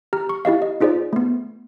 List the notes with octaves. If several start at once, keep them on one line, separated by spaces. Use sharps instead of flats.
G4 A#5 F6
C#6
E4 G4 D#5 F5
D#5
D#4 F4 G#4 C5 D5
A3 B3